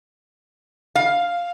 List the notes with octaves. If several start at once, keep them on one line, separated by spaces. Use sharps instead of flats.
F5